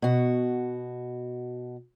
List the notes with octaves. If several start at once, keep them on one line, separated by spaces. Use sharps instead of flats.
B2 F#4